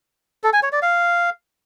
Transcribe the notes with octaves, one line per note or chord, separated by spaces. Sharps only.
A4
G#5
C#5
D5
F5